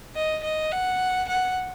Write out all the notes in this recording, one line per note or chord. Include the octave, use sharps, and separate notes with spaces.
D#5
D#5
F#5
F#5